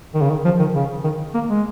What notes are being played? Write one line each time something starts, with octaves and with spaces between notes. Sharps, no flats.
D#3
C#3
D#3
F3
D#3
C#3
D#3
A#3
G#3